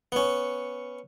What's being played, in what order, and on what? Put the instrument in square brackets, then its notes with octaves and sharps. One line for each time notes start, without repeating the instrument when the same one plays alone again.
[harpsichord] B3 C#4